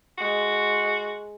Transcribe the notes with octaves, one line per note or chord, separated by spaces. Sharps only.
G#3 F#4